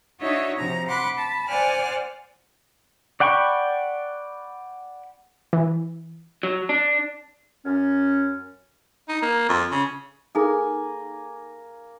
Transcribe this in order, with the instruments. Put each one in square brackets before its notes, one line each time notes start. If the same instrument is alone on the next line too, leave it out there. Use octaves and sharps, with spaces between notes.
[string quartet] D4 D#4 F#4 C#5 D#5 E5
C3 F3 A#5
F#5 B5 C6 D6 F#6
A5 B5
C5 D5 F#5 G#5 F6 F#6
[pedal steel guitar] D5 F#5 G5 B5 C#6
[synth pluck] E3
[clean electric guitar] F#3
D4
[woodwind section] F#2 C#4
[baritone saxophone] D#4
A#3
F2
C#3
[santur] A#3 G#5 [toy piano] D#4 G#4 A4